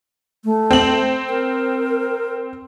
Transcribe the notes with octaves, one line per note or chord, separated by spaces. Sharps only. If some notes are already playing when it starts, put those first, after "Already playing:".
A3
C4 F#7
A#4